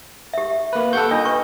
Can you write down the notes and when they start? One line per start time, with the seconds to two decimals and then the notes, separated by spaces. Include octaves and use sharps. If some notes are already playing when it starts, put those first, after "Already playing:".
0.33 G4 E5
0.73 A#3 B4
0.93 G4 A4 F#5 G6
1.11 D4 F4 D#5
1.25 B4 C#6